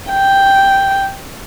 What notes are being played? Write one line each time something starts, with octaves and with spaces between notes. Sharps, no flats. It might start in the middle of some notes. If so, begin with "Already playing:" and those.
G5